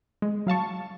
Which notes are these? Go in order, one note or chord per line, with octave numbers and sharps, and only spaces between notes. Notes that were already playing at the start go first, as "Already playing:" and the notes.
G#3
F#3 F5 A5 C#6